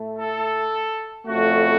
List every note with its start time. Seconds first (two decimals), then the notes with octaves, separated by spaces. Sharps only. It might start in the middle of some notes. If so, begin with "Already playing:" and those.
Already playing: A2 A3
0.18 A4
1.26 F2 C#3 A3 F#4